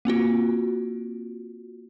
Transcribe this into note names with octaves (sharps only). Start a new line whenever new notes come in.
A#3 C4 F4 F#4